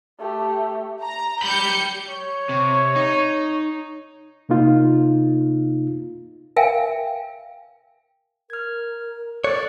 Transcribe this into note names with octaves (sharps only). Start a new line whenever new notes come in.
A3 G4
A#5
G4 B5 G6 C#7
C#5
C3
D#4
C3 A#3 D#4 F4
A#4 E5 F5 G5 G#5
A#4 F6 G#6
A4 C#5 D5 F#6